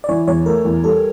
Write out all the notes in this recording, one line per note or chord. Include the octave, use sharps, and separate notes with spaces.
D5
E3 C#5
E2 C#5
A3 A#4
E2
G3 A4